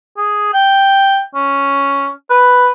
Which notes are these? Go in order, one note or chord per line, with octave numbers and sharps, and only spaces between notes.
G#4
G5
C#4
B4